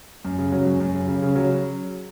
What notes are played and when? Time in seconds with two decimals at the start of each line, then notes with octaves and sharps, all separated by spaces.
0.25 F#2
0.39 C#3
0.52 F#3
0.67 F#2
0.80 F#2
0.95 C#3
1.08 C#3
1.22 C#3
1.36 F#3